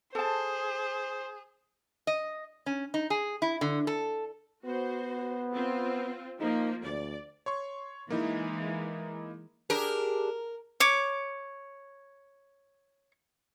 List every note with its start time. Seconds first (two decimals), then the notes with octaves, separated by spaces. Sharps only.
0.15 G#4 A4 C5 A5
2.07 D#5
2.66 C#4
2.94 D#4
3.10 G#4
3.42 E4
3.61 D3
3.87 A4
4.65 B3 F#4 C5
5.53 C4 F4
6.41 F3 A#3 D#4
6.84 D2 D5
7.46 C#5 C6 C#6
8.10 E3 G#3 A#3 D#4 E4
9.70 D4 G4 G#4 A#4
10.80 C#5 D6